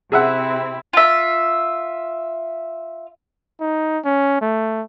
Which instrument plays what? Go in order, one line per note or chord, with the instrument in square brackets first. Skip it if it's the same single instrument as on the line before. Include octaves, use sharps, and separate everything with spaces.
[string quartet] C3 C4 E4 [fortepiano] G#4 E5 F#5
[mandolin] F4 E5
[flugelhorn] D#4
C#4
A3